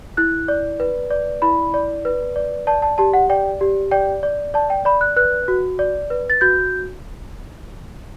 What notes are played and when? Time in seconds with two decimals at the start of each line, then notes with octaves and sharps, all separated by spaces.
0.17 E4 F#6
0.48 D5
0.80 B4
1.10 D5
1.42 E4 B5
1.74 D5
2.05 B4
2.36 D5
2.67 D5 A5
2.82 A5
2.98 G4 A5
3.13 F#5
3.30 D5 G5
3.61 G4
3.91 D5 G5
4.23 D5
4.54 D5 A5
4.70 G5
4.85 D5 B5
5.01 F#6
5.16 B4 F#6
5.48 F#4
5.79 D5
6.10 B4
6.30 A6
6.41 F#4 G6